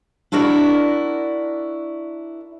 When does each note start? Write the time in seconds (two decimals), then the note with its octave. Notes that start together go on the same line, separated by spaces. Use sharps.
0.32 D4 E4 F#4 A#4 D5